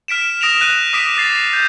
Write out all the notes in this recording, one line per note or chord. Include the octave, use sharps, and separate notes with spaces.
F6 B6 D7 E7
D#6 A#6 D7 E7 F7
F#6 D#7
D6 D#6 F#6 B6 D7 E7
D6 A6 C7
G6 A6